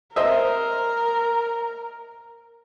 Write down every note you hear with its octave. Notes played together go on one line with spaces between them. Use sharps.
A#4 C5 D#5 E5